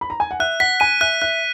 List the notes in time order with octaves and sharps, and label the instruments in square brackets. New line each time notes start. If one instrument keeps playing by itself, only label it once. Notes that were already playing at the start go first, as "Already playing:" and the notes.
[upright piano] B5
A#5
G#5
F#5
[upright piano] E5 [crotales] F#6
[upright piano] F#5 [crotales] B6
[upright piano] G#5 [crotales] D#7
[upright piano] E5 [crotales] F#6
[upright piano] E5 [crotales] F#6